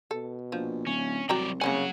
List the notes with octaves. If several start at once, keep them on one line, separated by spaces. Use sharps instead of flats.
B2 A4
A#1 F3
D1 C#4
C2 F#3 F#4 D5 G5 A#5
C#3 F#3 A#3 C#4 F#5 G#5